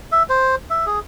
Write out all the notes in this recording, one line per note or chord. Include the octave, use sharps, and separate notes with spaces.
E5
C5
E5
G#4